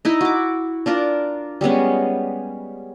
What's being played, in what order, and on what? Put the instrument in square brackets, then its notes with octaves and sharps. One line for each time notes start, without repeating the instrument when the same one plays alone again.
[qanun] D#4 E4 D#5
F#4 D6
D4 F4 A#4 D5
G3 G#3 B3 C#4